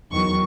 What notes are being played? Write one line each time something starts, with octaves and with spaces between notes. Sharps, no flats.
E2 D#3 F#3 C#6